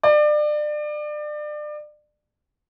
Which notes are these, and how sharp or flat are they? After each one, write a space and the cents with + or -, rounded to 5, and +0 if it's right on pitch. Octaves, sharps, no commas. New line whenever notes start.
D5 +30